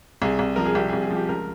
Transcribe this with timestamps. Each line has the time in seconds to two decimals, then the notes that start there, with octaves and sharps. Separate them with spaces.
0.22 C2 G#4
0.39 C2
0.56 F3 A#4
0.65 G#4
0.75 C2 G4
0.88 G#4
0.93 C2
1.02 G#4
1.11 F3 G4
1.28 C#2 A#4